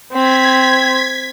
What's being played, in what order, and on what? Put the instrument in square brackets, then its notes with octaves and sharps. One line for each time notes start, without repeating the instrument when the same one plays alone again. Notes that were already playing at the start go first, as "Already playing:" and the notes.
[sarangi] C4 [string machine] G#6 B6